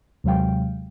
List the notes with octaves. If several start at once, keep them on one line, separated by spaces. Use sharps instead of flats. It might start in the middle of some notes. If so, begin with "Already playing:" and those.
D#2 C3 F#3 G#3 F5 G5